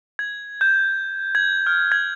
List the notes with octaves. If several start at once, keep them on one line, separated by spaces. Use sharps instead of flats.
G#6
G6
G#6
F6
G#6